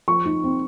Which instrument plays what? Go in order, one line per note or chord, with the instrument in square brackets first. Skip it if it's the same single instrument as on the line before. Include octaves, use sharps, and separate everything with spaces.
[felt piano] F3 C#6
D#4
C4